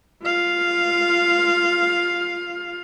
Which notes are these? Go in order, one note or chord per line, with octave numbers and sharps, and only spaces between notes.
F4 F5